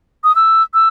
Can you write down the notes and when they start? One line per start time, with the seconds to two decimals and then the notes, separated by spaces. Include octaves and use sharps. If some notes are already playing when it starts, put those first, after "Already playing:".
0.24 D#6
0.35 E6
0.74 E6